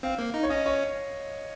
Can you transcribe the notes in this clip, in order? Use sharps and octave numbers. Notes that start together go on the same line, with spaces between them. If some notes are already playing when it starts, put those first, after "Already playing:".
C4 F5
A#3
D#4
C#5
C#4 D#5
C#5